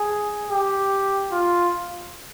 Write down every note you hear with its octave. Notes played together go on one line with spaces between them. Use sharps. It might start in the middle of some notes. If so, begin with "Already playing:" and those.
Already playing: G#4
G4
F4